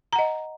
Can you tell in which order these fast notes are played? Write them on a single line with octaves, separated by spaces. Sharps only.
A#5 F#5 D#5